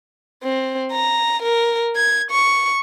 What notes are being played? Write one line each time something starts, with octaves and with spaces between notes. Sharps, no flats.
C4
A#5
A#4
G#6
C#6